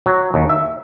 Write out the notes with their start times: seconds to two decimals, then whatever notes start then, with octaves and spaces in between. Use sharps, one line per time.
0.06 F#3
0.34 D#2
0.49 E5